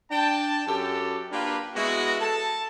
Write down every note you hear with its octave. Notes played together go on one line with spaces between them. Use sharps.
D4 G5 A5
F#2 G4 A4
A#3 D4 F4 G4 A#4 B4
G#3 B3 E4 F#4
A4 A5